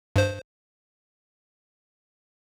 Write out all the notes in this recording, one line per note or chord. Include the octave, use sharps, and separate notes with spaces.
G2 C5